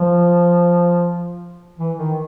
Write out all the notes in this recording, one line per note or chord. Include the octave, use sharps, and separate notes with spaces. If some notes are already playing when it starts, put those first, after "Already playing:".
Already playing: F3
E3
D#3